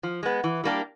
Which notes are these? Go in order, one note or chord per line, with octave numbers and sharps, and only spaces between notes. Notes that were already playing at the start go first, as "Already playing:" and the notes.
F3
G#3 B3
E3
G3 A#3 D4 G4